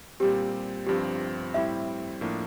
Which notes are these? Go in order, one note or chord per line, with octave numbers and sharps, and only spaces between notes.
A#2 G3 C4 G4
G1 G2 F3 C4 G4
A2 G3 C4 E4 E5
A2 F3 A#3 D4 A4